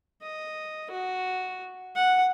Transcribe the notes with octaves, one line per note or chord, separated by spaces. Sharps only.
D#5
F#4
F#5